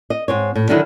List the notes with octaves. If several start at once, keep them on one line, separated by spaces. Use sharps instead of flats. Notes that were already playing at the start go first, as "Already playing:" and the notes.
D#5
G#2 C4 C#5
A2
D3 D#3 F#3 D#4 E4